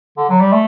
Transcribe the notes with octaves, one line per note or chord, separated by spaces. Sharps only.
D3
F#3
G3
A3